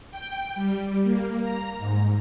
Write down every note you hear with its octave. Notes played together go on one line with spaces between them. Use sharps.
G5
G3
A#3
A#5
G#2